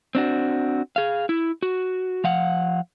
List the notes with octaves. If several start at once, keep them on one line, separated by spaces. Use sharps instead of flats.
C4 D4 F#4
G#4 F5
E4
F#4
F3 F5 F#5